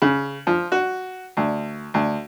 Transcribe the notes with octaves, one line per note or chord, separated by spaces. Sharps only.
C#3
F3
F#4
D2
D2